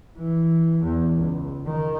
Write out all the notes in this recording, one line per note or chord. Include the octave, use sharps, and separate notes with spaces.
E3
E2
C#2
D#3